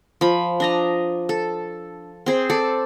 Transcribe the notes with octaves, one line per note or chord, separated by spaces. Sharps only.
F3 B5
D4 D#5 A#5
A4
C4 G#4 C5
A4 D5